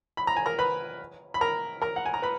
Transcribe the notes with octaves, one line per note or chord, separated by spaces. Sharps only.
B5
A#5
G#5
A#4 A#5
B4 B5
B5
A#4 A#5
A#4 A#5
F#5
G#5
A#5
B4 B5